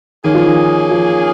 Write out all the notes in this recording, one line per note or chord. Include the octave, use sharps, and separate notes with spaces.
D#3 A#3 C#4 G#4
F3
D#3
F3